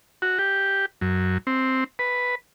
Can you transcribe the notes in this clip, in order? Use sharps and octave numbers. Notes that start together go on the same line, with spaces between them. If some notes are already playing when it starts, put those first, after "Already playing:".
F#4
G4
F#2
C4
B4